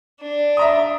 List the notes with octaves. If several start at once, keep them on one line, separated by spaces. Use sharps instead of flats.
D4
E5 A#5 D#6